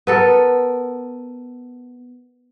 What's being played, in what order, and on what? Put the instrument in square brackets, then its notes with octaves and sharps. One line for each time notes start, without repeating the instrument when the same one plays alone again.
[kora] B3 A4 A#4